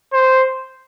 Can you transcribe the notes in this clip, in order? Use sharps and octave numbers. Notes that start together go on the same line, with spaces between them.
C5